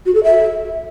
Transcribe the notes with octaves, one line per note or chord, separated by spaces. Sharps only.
F#4
A4
E5